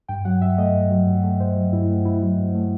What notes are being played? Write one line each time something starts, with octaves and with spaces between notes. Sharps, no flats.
G2 G5
F#3 F#5
G2 E5
A3 D#5
G2
F#3
G2
A3
G2 C5
F#3
G2 E4
A3
G2 E4
F#3
G2
A3